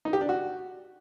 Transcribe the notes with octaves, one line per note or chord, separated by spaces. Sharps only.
D#4
G4
D4
F#4